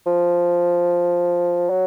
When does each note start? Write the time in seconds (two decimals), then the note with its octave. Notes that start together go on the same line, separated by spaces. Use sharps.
0.06 F3
1.70 F#3